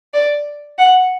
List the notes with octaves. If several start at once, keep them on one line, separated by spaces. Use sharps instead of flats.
D5
F#5